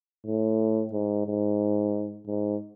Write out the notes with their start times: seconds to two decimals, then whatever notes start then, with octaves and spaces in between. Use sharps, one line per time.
0.26 A2
0.93 G#2
1.27 G#2
2.27 G#2